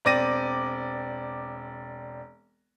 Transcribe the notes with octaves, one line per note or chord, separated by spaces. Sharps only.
E1 C4 D5 D6 A#6 D#7